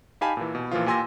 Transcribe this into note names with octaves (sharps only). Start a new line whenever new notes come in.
D#4 G4 F5 G#5 A5 B5
A#2 E3
B2
A#2 E3 F3 F4
A#2 G4 G#5 C6 E6 A#6